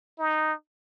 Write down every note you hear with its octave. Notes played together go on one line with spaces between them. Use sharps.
D#4